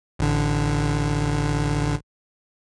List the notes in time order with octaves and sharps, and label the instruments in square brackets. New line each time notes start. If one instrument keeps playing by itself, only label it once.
[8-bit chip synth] A1 D3